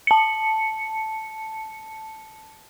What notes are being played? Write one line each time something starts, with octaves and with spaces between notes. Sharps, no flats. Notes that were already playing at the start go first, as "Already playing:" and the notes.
A5 C#7